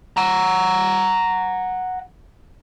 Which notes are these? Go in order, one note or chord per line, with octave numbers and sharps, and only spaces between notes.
F#5 A#5